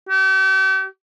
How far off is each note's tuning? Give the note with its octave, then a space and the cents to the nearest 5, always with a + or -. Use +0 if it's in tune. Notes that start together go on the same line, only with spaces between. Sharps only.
G4 -40